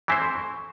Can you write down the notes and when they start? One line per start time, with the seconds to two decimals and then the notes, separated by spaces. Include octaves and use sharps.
0.08 E3 C4 E4 C5 G#5
0.22 C6
0.35 C#6